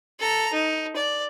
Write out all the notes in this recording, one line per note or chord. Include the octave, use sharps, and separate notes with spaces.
A4 A#5
D#4
D5